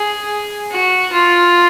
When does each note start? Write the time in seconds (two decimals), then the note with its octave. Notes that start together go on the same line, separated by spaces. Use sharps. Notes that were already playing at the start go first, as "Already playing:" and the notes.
Already playing: G#4
0.71 F#4
1.12 F4